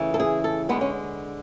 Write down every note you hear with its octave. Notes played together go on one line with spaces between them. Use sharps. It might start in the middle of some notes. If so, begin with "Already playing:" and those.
Already playing: C#3 E3 A3
A4
G#4
A4
D3 G#3 B3
C#4